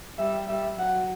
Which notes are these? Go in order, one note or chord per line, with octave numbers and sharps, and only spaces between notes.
G3 E5
G3 E5
F#3 F#5